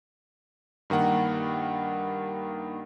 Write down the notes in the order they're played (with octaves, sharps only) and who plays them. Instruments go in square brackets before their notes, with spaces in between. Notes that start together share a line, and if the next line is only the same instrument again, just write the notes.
[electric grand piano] G2 D#3 A#3 F#5